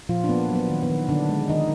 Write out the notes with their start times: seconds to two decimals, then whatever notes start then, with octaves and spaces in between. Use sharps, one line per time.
0.09 A#2 F3 F4
0.24 D4
0.29 A#3 B3
0.50 F#3
0.55 B3
0.70 D#3
0.83 B3
0.90 D#3
1.09 D3 D4
1.29 G#3
1.49 D3 D#3 D#4